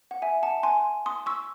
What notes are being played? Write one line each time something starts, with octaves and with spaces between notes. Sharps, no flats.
F#5
E5 G#5
F#5 A5
G#5 C6
C6 D#6
C#6 E6